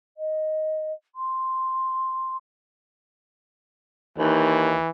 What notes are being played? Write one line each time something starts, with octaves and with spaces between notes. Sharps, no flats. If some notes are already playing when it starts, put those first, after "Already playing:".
D#5
C6
D#2 E3